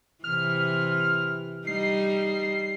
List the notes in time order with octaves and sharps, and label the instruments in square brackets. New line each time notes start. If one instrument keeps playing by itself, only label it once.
[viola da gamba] C3 E3 [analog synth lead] F6
[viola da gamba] G3 D#4 [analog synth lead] C7